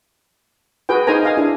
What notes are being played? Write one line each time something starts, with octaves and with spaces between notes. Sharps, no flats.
F#4 G#4 B4 G5
D#4 G#4 A#4 C5 G#5 A#5
D#5 F5 G#5
D4 E4 G#4